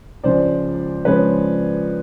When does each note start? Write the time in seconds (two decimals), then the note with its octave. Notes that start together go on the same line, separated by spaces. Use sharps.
0.24 C#2 C#3 F3 G#3 C5 D5
1.05 C#3 F3 G#3 B4 C#5